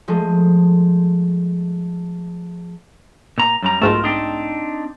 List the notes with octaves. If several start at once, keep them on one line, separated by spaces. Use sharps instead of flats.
F3 G#3 A3
A#2 A#5
F#2 G3 A#5
B1 G#2 A3 F4 A#4 A5
C4 D4 D#4